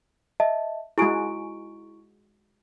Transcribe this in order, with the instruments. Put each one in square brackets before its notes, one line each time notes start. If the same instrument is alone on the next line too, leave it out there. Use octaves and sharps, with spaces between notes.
[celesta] D#5 E5 A5
[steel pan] G#3 F#4 G#4 [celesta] E4 C#6 D7